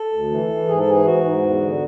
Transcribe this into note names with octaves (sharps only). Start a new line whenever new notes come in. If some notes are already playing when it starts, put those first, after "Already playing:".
Already playing: A4
D2
E3
E3
G#2 G#4
A4
E3 G#4
G#2 F#4
G#2
E2
D3